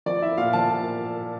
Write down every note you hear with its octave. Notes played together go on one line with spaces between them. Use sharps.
F3 D5
E4 E5
A#2 F5
F3 A5